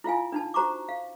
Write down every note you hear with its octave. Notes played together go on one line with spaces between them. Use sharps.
E4 F4 F5 G#5
D4 D#4 A5
F#4 C5 A#5 C#6 D6
F5